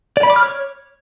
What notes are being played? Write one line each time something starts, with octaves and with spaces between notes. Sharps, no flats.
D5
B5
D6
F6
C#5